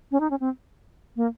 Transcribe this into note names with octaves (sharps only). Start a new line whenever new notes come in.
C#4
D#4
C#4
C4
A#3